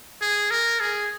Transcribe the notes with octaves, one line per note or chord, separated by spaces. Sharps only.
G#4
A#4
G#4